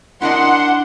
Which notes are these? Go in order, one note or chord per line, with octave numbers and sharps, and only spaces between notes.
D4 E4 A#4 D#5 F#5 C6